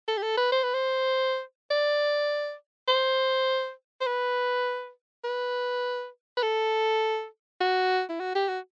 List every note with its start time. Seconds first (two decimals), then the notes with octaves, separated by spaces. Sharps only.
0.08 A4
0.18 G4
0.22 A4
0.37 B4
0.52 C5
0.63 B4
0.74 C5
1.71 D5
2.88 C5
4.01 C5
4.06 B4
5.24 B4
6.37 B4
6.43 A4
7.61 F#4
8.09 E4
8.20 F#4
8.35 G4
8.49 F#4